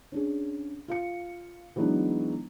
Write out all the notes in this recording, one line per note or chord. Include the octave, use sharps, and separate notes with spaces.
C#4 D4 G#4
F4 F5 C#7
E3 F#3 G#3 B3 D4 D#4